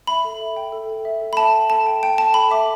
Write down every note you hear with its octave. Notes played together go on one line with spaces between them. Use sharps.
E5 B5
A4
E5
G5
A4
G5
E5
A4
B5
E5 A5
G5
A4 A5
G5
G5
A4 A5
A4 B5
E5 D6